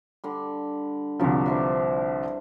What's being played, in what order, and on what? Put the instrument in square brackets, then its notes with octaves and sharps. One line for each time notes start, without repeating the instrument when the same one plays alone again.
[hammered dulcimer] D3 G3
[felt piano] C2 D3 F3 [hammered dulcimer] G2 F#3
[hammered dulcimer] D4 E4 C5